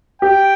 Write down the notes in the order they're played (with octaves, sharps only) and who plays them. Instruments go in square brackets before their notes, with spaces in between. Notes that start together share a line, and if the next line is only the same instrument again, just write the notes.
[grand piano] G4 [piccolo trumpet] G5